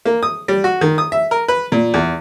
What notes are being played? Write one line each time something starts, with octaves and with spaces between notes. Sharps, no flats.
A#3
D#6
G3
F#4
D#3
D#6
E5
A#4
B4
A#2
E2